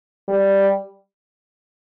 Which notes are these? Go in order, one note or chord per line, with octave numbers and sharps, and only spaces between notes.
G3